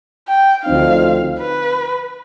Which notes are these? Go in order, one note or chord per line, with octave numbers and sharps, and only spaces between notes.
G5
D2 D3 F3 C4 D#4 F5
B4